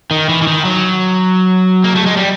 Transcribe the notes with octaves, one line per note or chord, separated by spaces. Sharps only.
D#3
E3
E3
D#3
F#3
A#3
A3
G#3
G3